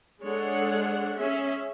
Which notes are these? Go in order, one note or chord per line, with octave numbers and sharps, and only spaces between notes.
G#3 D4 G#4 A4 C#5 F#5
C#4 G#4 E5